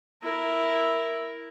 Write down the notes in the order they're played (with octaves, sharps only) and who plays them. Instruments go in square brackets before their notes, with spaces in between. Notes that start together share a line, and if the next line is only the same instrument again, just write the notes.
[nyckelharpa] E4 A#4